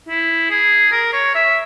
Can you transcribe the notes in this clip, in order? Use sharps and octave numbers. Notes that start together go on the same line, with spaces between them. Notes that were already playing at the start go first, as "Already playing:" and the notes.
E4
G#4
A#4
C#5
E5